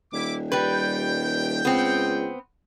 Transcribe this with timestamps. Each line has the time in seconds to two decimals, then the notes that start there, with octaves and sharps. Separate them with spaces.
0.13 D#1 E4 D6
0.52 G3 B4 G5
1.65 C#2 B3 C4